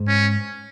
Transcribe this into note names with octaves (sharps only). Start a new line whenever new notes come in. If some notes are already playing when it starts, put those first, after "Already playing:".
Already playing: G#2
C#4